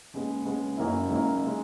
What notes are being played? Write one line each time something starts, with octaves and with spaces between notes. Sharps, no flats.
D#2 C#3 G#3 B3
D#2 C#3 G#3 B3
F#1 F#2 D#3 A#3 E4
F#1 F#2 D#3 A#3 E4
C#3 G#3